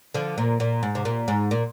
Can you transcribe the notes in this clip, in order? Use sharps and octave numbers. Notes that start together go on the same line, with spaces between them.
D3 F3
A#2
A#2
G#2
C3
A#2
G#2
A#2